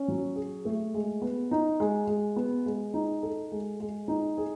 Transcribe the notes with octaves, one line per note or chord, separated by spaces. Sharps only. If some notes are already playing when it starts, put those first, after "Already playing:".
Already playing: C#4
F#3
G#4
A3
G#3
B3
D#4
G#3
G#3
B3
G#3
D#4
A4
G#3
G#3
D#4
G#4